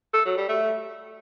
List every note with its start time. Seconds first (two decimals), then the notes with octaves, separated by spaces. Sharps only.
0.14 A4
0.25 F#3
0.37 G3
0.49 A3